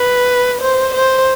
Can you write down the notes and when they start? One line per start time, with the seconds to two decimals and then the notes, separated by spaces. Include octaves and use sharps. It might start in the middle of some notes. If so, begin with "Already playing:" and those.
Already playing: B4
0.61 C5
0.94 C5